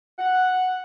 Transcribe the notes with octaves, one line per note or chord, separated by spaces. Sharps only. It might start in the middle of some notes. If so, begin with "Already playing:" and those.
F#5